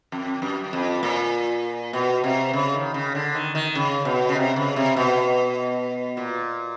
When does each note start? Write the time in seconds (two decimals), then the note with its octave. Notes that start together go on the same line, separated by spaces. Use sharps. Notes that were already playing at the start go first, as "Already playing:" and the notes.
0.12 F2
0.42 F#2
0.73 F2
1.03 A#2
1.93 B2
2.24 C3
2.53 C#3
2.74 D#3
2.94 C#3
3.15 D3
3.35 D#3
3.55 D#3
3.75 C#3
4.05 B2
4.29 C#3
4.36 C3
4.56 C#3
4.76 C3
4.96 B2
6.17 A#2